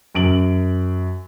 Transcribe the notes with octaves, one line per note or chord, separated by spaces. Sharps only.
F#2 D7 F#7